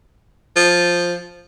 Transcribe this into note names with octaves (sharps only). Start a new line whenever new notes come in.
F3